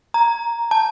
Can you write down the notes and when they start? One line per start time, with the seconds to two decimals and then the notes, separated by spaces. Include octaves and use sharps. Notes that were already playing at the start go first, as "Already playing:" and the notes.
0.14 A#5
0.71 A5